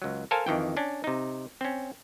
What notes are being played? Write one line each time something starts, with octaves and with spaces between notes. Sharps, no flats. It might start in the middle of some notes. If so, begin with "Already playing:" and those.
C#2 F#3
A4 A#4 C5 F5 G#5 A5
F2 D#3 E3 G5
C#4 D4
C3 D#4
C4 C#4